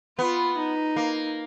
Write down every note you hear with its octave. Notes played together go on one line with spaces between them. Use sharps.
B3 F4
D#4
A#3